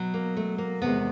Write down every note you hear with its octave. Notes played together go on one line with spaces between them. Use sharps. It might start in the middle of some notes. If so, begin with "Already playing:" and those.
Already playing: B2 F#3
A#3
A3
A#3
E2 C3 D#3 G#3 B3